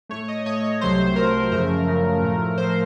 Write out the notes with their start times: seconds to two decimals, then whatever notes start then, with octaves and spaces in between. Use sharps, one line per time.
0.09 A2 A3 C#5
0.28 D#5
0.46 A2 A3 C#5
0.80 C2 C3 F#3 A3 C5
1.16 C2 C3 F#3 A3 A#4
1.52 F#2 C#3 F3 A3 A#4
1.87 F#2 C#3 F3 A3
2.23 A2 F3 A3
2.58 A2 F3 A3 C5